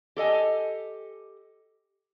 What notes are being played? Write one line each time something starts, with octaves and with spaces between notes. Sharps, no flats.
G4 A4 D#5 G#5